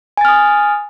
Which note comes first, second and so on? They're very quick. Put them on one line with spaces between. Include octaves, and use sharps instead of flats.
G#5 A6 F6 D#6